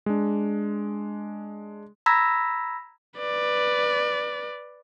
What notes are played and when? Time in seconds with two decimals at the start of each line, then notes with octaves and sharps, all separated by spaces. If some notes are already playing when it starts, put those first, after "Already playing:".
0.06 G#3 D4
2.06 A#5 B5 E6 G#6 A#6 B6
3.19 B4 D5